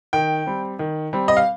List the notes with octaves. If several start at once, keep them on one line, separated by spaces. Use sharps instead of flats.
D#3 G5
G3 C4
D#3
G3 C4
D#5
F5